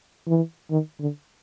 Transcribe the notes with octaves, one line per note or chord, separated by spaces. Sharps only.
E3
D#3
D3